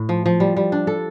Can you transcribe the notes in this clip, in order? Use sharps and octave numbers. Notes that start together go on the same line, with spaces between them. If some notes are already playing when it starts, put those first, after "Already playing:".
Already playing: A2
F3
F3
G3
G3
D4
A4